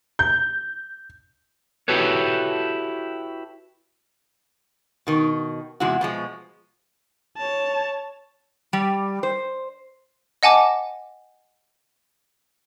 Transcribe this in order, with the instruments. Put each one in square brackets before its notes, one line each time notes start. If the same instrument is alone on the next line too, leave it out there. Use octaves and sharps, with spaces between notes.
[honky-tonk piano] G6
[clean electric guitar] E4 F#4 G4 A4 B4 C#5
[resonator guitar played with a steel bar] B2 D#3
E2 C3 G#3 E4 F#4
B2 F3 G#3
[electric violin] C#5 A5
[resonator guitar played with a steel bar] G3
C5
[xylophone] D#5 F#5 G#5 A5 D6